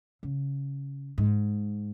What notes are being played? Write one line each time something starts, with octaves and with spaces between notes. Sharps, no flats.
C#3
G#2